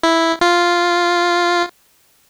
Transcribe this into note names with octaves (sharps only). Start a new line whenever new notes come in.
E4
F4